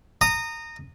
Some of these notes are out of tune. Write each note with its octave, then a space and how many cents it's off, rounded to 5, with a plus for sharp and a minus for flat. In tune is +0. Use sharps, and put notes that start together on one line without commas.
A#5 -20 D#6 -15